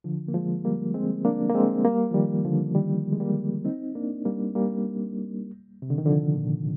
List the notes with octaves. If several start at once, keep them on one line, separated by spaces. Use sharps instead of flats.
D3 F3
A#3
F3 G#3
G3 A#3
G#3 C4
A#3 D4
A#3
G#3 C4
G3 A#3
F3
D#3 G3
D3 F3
D#3 G3
G#3
G3 A#3
C4 D#4
A#3 D4
G3 A#3
G3 A#3
C3
D3
D#3
D3 F3
A#2